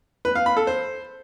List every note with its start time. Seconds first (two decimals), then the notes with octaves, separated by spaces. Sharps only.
0.25 B4
0.35 F5
0.46 B5
0.57 A4
0.67 C5